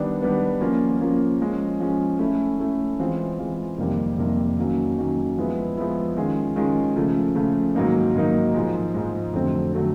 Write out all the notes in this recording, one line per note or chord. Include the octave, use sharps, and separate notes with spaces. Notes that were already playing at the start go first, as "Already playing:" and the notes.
Already playing: D#3 G3 B3 D4
D#3 G3 B3 D4
F3 A#3 C#4 F4
F3 A#3 C#4 F4
F3 G#3 C#4
F3 G#3 C#4
A3 C#4 E4
A3 C#4 E4
E3 G#3 C4 F4
E3 G#3 C4 F4
F2 C3 D#3 G3 A#3
F2 C3 D#3 G3 A#3
D#3 F#3 A#3 C#4
D#3 F#3 A#3 C#4
F3 G#3 B3 E4
F3 G#3 B3 E4
D#3 G#3 C#4 F4 G#4
D#3 G#3 C#4 F4 G#4
C#3 F3 A3
C#3 F3 A3
G#2 D#3 F#3 A#3 D#4
G#2 D#3 F#3 A#3 D#4
G#2 F3 G#3
G#2 F3 G#3
F2 D3 F#3 A3 C4
D3 F#3 A3 C4